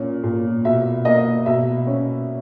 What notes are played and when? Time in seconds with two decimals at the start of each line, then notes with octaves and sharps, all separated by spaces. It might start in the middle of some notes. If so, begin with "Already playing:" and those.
Already playing: A#2 C#4
0.24 A#2
0.65 B2 E5
1.05 A#3 D#5
1.46 B2 E5
1.87 C#4